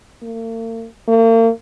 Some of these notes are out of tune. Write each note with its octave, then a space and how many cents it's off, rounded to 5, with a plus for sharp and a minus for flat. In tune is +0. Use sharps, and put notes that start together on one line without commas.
A#3 -45
A#3 -40